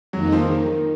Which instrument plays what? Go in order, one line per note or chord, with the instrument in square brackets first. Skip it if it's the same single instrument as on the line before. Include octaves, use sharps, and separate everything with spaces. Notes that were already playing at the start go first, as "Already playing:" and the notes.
[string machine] F2 D#3 A#3 D#4 [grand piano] F#3
[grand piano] F3
D#3